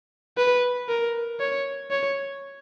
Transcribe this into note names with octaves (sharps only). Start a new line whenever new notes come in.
B4
A#4
C#5
C#5